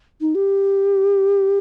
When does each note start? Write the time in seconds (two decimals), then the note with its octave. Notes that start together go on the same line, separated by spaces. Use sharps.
0.21 D#4
0.35 G4